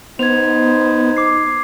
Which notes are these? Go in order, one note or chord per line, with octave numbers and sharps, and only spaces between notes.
B3 D#4 C5 G#6 F7
D6 C7